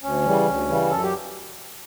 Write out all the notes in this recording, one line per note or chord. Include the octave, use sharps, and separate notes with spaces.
D2 C#4
C#3 E3 G3
D2
C#3 E3 G3
F#2 A4
G4